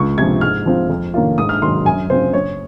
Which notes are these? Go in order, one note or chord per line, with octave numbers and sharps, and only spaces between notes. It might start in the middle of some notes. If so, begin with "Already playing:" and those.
Already playing: C#2 C#6
C3 F3 G#6
G#2 F6
F3 C4 F4
F2
D#3 A#3 C#4 F4
G#2 D#6
F6
D#3 F#3 A#3 C6
F#2 G#5
C#3 G#3 C4 F4 C5
F#1 C#5